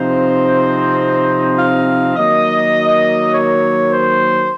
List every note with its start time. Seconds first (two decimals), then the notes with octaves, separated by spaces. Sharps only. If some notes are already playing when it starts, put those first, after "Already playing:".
Already playing: C3 F3 C4 D#4 C5
1.57 F5
2.16 D#3 F#3 A#3 D#5
3.33 C#5
3.92 C5